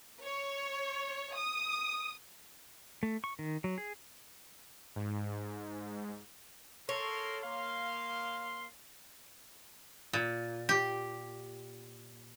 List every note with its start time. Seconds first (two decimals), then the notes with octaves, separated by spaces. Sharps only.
0.24 C#5
1.36 D#6
3.03 A3
3.24 C#6
3.39 D#3
3.64 F#3
3.78 G#4
4.96 G#2
6.89 A#3 A4 A#4 C#5 C6
7.43 A#3 F5 C6
10.13 A#2
10.69 G4